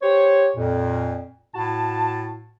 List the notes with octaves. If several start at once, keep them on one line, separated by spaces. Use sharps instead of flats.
G4 C5 C#5
F2 A#2
A2 F#4 A5